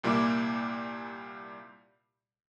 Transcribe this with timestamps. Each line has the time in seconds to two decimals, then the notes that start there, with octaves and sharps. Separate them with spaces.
0.04 C2 A#2 G3 A#3 E4 D6